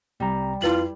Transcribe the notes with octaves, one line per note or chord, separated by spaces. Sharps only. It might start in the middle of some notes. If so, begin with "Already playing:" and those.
C2 C3 G3 A#5
F2 E4 F4 B4 F#7